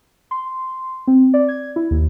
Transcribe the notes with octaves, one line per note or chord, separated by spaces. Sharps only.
C6
C4
D5
G#6
E4
D#2